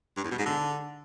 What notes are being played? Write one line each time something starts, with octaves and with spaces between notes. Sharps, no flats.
G2
E2
B2
G#2
D3